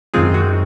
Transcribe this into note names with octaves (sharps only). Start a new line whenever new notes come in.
F#2 D#3 G#3 C4 F4 G#4
F#4